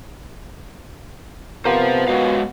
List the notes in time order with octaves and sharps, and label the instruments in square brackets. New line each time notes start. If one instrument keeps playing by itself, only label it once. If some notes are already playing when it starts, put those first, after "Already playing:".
[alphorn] C3 [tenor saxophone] B3 [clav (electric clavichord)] F4 G4 A#4 [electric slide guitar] C5 F5
[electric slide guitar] F#3 G#3 F5 [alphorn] F#4